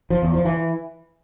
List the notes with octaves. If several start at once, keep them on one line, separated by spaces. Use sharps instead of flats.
F3
E2
F3
E3